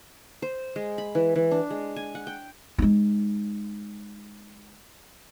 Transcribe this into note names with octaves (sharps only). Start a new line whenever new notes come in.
C5
G#3
B5
E3
E3
D4
G#3
G#5
F#5
G5
G#3 D#4